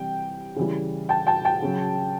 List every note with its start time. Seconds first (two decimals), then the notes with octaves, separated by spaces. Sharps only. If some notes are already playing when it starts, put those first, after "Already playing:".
Already playing: C3 E3 G3 G5
0.56 C#3 E3 G3
1.09 G5 A5
1.27 G5 A5
1.45 G5 A5
1.62 C#3 F#3